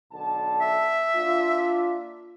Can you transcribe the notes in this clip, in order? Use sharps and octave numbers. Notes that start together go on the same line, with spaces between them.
B1 D3 A5
E5
A#3 D4 F4